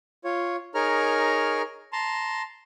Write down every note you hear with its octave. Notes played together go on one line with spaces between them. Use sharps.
F4 C#5
D#4 G#4 A#4 C#5 A#5 F6
A5 A#5 C6